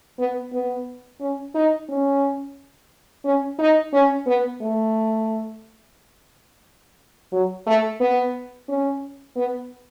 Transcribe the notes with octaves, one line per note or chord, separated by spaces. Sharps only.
B3
B3
C#4
D#4
C#4
C#4
D#4
C#4
B3
A3
F#3
A3
B3
C#4
B3